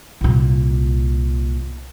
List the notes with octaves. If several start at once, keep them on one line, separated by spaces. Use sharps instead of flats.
C2 A#2